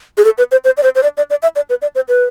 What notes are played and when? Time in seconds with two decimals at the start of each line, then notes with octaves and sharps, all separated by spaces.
0.18 G#4
0.25 A4
0.38 B4
0.52 C5
0.65 C5
0.77 D5
0.83 C5
0.95 C5
1.03 D5
1.17 D5
1.30 D5
1.43 E5
1.56 D5
1.70 B4
1.82 D5
1.95 C5
2.08 B4